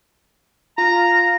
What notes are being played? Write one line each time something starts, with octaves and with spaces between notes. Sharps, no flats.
F4 A#5